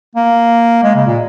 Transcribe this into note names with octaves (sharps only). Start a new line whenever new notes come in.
A#3
G#3
C#3
A#2